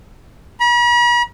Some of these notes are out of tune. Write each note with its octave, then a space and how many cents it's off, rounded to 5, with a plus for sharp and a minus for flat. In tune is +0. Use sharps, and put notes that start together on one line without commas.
B5 -45